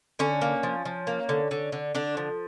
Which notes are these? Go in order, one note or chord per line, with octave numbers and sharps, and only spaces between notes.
D3 C#4
A#3
F3
F3
A#3
D3
D3
D3
D3 D4
F3